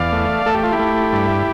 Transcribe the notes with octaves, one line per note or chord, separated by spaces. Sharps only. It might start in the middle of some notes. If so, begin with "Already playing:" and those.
Already playing: E2 D5 F5
A3
A3 A4
G4
F4
E4 G4
A3
G2